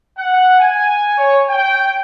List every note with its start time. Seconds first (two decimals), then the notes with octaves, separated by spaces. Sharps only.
0.17 F#5
0.59 G#5
1.18 C#5
1.49 G5